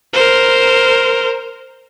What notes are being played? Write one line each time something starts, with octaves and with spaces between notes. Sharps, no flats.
A#4 C5